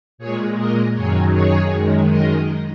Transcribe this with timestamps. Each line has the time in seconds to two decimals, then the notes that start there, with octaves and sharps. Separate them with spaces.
0.18 A#2 G#3 G#4 C#5
0.56 A#4 D#5
0.94 F#2 D#3 F#3 G#4 C#5
1.33 G#4 C#5
1.71 F#2 D#3 G#3
2.09 A#4 D#5